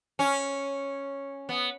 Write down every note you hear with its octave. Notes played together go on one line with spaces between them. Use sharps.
C#4
B3